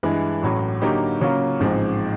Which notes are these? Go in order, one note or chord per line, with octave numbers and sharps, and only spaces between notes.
G2 E3 G#3
A1 A2 F#3
D3 F#3 A#3 D#4 G4
C#3 F#3 A#3 C#4 F4
A1 G#2 F3 G#3 C4